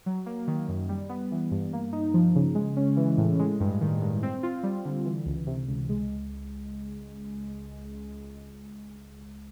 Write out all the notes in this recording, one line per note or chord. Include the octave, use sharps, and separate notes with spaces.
F#3
A#3
D#3
F#2
G3
B3
E3
G2
A#3
D#4
F3
C#3
G#3
C#4
E3
A2
G#3
G2
D#3
G2
C4
F4
G3
D3
E3
C#2
C3
C#2
G#3